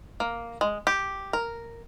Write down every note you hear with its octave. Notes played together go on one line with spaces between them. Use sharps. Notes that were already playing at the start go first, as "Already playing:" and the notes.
A#3
G#3
G4
A#4